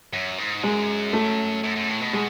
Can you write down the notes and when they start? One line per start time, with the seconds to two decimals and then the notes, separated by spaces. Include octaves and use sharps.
0.13 F#2
0.38 G#2
0.63 F#2 G#3
1.13 A3
1.64 F#2
1.76 F#2
1.88 A2
2.01 B2
2.13 G#3